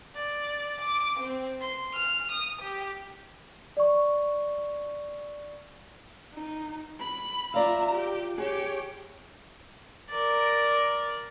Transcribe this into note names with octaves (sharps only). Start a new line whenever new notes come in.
D5
D6
C4
C6
F6
D#6
G4
D5 C#6
D#4
B5
F4 D5 E5 F5 A#5
G4
G4 G#4 C#5
A#4 D5